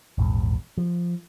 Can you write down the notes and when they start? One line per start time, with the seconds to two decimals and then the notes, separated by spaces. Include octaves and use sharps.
0.18 A#1 E2 G#2
0.77 F3